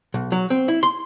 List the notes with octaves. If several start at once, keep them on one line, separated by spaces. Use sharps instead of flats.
B1
F#3
C4
E4
C6